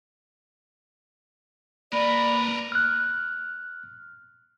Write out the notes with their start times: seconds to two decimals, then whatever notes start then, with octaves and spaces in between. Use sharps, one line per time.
1.93 A#3 A#4 B4 D5 B5
2.72 F6 F#6